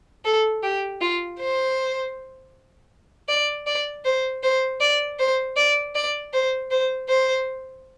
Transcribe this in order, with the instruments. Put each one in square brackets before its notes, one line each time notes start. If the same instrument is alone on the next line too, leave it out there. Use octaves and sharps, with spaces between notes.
[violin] A4
G4
F4
C5
D5
D5
C5
C5
D5
C5
D5
D5
C5
C5
C5